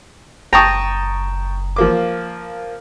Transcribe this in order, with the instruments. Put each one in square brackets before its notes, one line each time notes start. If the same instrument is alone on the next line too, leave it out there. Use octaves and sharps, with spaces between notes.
[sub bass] F#1 [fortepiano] G5 A5 C#6 [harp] A#5 D#6
[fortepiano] F3 A#3 D6